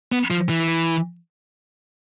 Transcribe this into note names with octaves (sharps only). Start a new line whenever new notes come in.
B3
F3
E3